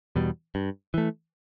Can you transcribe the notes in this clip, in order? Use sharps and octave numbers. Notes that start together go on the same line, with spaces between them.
E2 B2 G3
G2
E3 A3